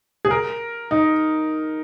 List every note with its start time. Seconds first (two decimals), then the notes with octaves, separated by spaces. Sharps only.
0.25 G#4
0.31 A#4
0.91 D#4